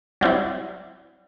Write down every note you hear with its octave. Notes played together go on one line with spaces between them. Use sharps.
F#3 G3 C4 E4